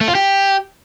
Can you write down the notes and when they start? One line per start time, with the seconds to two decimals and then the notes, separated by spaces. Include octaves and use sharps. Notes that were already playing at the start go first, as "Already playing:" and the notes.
0.01 A3
0.08 F4
0.15 G4